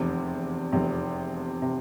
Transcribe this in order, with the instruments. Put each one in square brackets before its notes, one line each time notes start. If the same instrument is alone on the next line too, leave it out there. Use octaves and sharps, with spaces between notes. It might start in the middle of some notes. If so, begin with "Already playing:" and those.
Already playing: [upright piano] F1 E2 C3
F1 E2 C3
C3